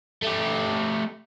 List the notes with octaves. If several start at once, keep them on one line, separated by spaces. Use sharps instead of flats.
A3 G4